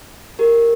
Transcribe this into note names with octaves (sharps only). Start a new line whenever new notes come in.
G4 A#4